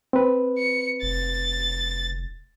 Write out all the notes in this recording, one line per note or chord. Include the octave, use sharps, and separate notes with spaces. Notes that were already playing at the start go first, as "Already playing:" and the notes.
C4 B4
C#7
F1 A6